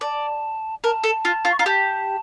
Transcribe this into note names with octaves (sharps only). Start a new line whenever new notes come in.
D5 A5
A#4 A5
A4
F4
F4
C#6
F4 A#5
G4 A5